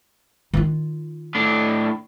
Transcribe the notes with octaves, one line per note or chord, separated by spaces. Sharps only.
D#3 F4
A2 D4